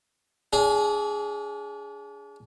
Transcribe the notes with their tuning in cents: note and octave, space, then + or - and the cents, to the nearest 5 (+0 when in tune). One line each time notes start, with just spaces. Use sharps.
D4 -35 G#4 +0